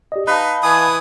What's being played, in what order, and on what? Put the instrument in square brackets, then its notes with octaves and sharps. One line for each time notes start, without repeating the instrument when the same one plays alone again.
[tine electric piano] G4 D5 D#5
[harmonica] D#4 [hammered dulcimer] B4 [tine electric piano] D#5 F5 A5
[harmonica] E3 D#6 [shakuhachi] G#5